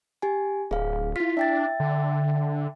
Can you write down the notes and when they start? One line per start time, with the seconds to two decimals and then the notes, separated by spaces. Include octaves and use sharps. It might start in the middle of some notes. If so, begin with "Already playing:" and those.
0.22 G4 G#5
0.71 D1 G#4 F5
1.16 E4 F4 B6
1.37 D4 E5 G5 A6
1.80 D3